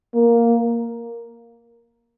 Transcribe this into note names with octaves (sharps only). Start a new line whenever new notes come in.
A#3